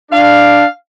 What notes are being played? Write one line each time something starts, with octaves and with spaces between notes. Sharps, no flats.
D4 F5